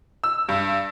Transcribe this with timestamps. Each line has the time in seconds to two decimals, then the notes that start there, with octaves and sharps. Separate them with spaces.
0.24 E6
0.49 G2